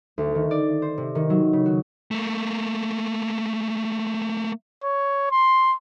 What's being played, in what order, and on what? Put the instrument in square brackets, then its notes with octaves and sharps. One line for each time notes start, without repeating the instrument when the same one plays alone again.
[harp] D2
D#3
D5
C5
C3
D#3
F#3
C#3
F#4
[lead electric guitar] A3 A#3
[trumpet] C#5
C6